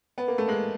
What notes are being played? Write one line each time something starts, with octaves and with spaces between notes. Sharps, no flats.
B3
A#3
A3
G#3 A#3